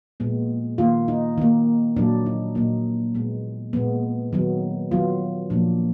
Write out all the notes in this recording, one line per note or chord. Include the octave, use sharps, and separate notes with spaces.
A#2 G#3 B3
D#3 A#3 F4
D#4
D#3 A#3
A#2 F#3 A#3 D4
D#4
A#2 F#3 A#3 D#4
A#2 G#3 B3
A#2 G#3 B3
D#3 F#3 B3
D#3 F#3 B3 F4
A#2 F3 A#3 D4